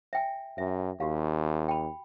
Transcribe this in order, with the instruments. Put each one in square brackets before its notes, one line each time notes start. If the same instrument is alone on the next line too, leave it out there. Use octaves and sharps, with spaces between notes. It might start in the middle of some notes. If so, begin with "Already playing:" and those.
[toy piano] E5 G5 G#5
[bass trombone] F#2 [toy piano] E5
[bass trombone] D#2 [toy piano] F#4 G4 F5
[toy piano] G5 B5